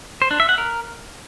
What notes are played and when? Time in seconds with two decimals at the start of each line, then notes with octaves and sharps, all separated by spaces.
0.22 C5
0.31 D4
0.40 E5
0.49 F#5
0.58 A#4